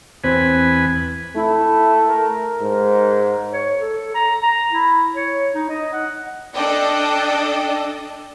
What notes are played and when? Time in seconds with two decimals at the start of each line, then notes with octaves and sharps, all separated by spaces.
0.24 E2 C4 B4 G#5
1.36 A3 E4
2.08 A#4
2.61 G#2
3.53 C#5
3.80 A4
4.15 A#5
4.43 A#5
4.71 E4
5.15 C#5
5.55 D#4
5.69 D#5
5.93 F#5
6.54 D4 A4 D5 D#5 G5